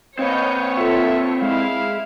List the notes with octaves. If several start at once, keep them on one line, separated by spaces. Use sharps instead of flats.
C4 B4 C#5 D#5 F5 G6
F4 A4 E5
G#3 E4 F5